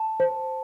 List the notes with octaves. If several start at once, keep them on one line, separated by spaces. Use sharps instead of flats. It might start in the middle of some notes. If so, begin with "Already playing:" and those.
Already playing: A5
C5